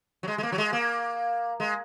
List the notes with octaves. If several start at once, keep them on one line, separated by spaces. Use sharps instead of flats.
F#3
G#3
G#3
A#3
F#3
G#3
A#3
G#3